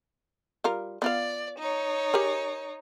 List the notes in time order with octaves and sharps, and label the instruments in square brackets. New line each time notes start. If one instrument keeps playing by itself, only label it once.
[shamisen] G3 F4 A#4
[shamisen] B3 F4 F5 [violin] D5
[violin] D#4 C#5
[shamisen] G4 G#4 A#4